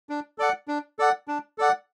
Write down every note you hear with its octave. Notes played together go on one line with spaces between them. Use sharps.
D4
A4 D5 F#5
D4
A4 D5 F#5
D4
A4 D5 F#5